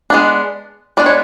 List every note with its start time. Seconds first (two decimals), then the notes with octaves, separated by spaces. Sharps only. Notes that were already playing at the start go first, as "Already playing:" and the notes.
0.10 G#3 B3 D4
0.97 G#3 B3 D4 D5
1.06 C#5